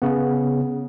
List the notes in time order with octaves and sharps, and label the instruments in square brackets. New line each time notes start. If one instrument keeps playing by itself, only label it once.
[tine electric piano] C#3 B3